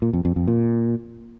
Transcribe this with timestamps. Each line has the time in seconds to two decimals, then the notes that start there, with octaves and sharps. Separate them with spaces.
0.02 A#2
0.13 F2
0.25 F2
0.36 F2
0.48 A#2